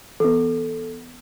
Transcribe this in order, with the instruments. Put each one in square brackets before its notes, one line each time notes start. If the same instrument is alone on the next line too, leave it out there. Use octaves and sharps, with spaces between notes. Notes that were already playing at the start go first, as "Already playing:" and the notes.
[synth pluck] E3 B3 [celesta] A4